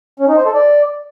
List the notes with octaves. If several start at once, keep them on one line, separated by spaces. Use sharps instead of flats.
C#4
D#4
C5
A4
D5